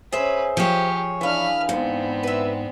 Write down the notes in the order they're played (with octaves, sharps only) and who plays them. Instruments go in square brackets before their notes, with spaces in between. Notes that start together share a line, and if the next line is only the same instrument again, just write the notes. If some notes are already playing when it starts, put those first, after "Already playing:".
[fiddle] C#4 B4 [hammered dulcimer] G#4 [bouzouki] C5 E5
[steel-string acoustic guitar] F3 C#5 [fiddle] G4
[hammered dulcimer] E3 D4 [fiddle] B4 F6 [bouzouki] E5 F5
[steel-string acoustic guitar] G#2 [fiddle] B3 C4
[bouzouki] B4 E5